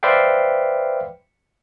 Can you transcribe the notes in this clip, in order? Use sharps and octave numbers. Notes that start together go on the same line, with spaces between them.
B4 C5 D5 E5 F5 G5